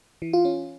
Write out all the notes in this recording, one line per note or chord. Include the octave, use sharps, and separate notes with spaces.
E3
F4
C#4